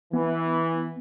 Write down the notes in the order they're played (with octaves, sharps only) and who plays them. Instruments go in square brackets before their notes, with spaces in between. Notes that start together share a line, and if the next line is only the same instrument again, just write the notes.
[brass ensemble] E3 [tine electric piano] B3